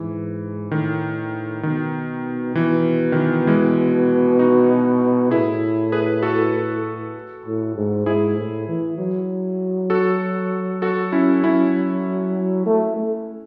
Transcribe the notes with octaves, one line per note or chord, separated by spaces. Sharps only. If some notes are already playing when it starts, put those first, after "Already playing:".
Already playing: G#2 E3
A2 D#3
B2 D#3
B2 E3
D#3
E3
E3 G#3
D#4 F#4
A2 E4 G#4
G#4 B4
F#4 A4
A2
G#2
G#2 E4 G#4
A2
E3
F#3
F#4 A4
F#4 A4
C#4 E4
C#4 E4
A3
A3